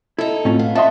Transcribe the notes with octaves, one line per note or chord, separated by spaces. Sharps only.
D#4 E4 A4
A2 C4 C#4 F4
B3 F5
A2 C#4 D#5 E5 F#5 A5 C6